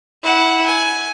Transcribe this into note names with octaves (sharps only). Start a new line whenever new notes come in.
E4 F#5
G#5